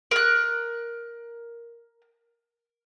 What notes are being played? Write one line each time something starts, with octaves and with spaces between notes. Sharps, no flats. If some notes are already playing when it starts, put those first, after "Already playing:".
A#4 F#6